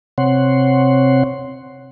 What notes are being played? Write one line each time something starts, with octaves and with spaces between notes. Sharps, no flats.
C3 C4 C#5 F#5 C6